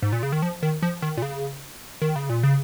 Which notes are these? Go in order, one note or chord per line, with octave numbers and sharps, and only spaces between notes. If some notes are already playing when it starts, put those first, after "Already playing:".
G#2
A#2
C#3
D#3
F3
D#3
F3
D#3
A#2
C#3
D#3
C#3
A#2
C#3